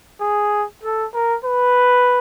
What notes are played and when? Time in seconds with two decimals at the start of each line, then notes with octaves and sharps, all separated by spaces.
0.21 G#4
0.84 A4
1.14 A#4
1.45 B4